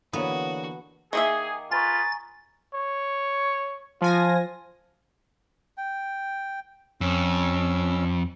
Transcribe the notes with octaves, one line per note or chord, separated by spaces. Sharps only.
D3 E3 A#3 B3 F#4 C#5 A#5 D#6
D#3 A#3 G#4 E5
F4 G#4 B4 G#5 A#5 C#6 A6
C#5
F3 F4 G#5 A#6
G5
F2 C#4 E6